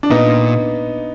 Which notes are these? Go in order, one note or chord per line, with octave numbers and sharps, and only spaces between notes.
D4
A#2 B3 D#4